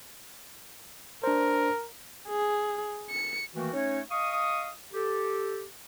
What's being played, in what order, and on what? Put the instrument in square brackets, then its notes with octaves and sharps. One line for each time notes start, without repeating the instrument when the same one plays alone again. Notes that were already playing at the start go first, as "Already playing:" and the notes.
[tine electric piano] D4 C5 [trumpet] A#4
[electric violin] G#4
C#7
[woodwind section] D#3 E3 A3 A#3 F#4
A3 C#4 D#4 C#5
D#5 F5 C#6 D#6
G4 A4